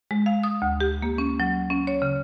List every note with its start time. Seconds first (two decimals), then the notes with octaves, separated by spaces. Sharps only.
0.11 G#3
0.26 F5
0.44 D#6
0.62 D2
0.81 G4
1.02 A#3
1.18 C#4
1.40 F#3
1.70 C#4
1.87 C#5
2.02 C#3